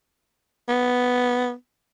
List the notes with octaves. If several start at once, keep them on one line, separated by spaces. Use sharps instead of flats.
B3